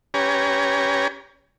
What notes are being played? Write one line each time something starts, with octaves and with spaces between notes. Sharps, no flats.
C#4 G4 B4 C#5 G#5 A#5